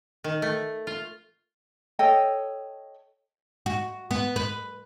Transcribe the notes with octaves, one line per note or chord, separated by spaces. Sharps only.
D#3
A3
F4
A4 C#5 D#5 G5
F#4
B3
B4